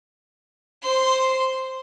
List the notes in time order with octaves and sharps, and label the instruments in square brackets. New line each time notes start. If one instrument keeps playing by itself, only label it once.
[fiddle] C5 C6